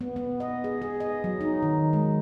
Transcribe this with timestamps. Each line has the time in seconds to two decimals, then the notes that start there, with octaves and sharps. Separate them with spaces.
0.01 B3
0.16 B3
0.40 D#5
0.64 G#4
0.82 G#4
1.00 D#5
1.24 F#3
1.41 D#4
1.63 D#3
1.93 G#3